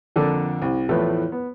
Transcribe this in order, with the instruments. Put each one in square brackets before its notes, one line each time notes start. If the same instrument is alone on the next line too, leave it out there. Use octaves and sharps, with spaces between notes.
[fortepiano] F2 D3 A#3 A4 D5
C2
E2 A2 F3 A3 B4
B3